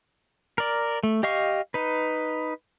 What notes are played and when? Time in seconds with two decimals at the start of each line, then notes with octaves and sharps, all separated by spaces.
0.58 A#4 D5
1.03 A3
1.23 G4 D#5 F5 C#6
1.74 D#4 B4